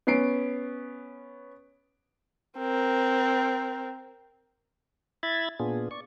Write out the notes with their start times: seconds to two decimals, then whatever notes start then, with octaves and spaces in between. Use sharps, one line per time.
0.07 B3 C#4 C7 D7
2.58 C4 A#4
5.23 E4 E5 B5 G#6 A6
5.60 A#2 B3 D4 F4 G#4
5.91 D5 C#6